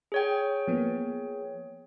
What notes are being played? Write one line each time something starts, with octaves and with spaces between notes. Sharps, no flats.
G#4 C#5 G5
F3 A#3 B3